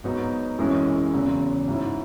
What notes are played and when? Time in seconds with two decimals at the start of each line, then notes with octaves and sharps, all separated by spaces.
0.04 G#2 F#3 B3 D#4 F#4
0.59 F#2 E3 G#3 C#4
1.14 E2 C#3 F#3
1.68 G#2 F#3 C#4 E4